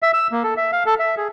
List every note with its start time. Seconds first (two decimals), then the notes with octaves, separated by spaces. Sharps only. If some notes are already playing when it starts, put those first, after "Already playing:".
0.03 E5
0.14 E6
0.32 A#3
0.44 A4
0.57 E5
0.72 F5
0.86 A4
0.99 E5
1.17 G#4